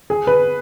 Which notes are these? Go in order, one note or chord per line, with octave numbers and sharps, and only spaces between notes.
G#4
B4